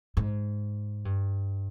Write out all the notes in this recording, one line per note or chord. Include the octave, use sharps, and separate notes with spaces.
G#2
G2